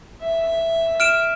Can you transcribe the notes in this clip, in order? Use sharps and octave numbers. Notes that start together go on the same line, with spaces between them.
E5
F6 D7 E7